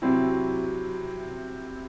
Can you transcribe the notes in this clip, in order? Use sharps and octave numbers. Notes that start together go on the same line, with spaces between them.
C3 F#3 C4 E4